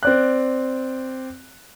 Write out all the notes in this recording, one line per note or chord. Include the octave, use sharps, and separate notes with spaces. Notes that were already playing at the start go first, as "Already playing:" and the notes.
C4 D5 F#6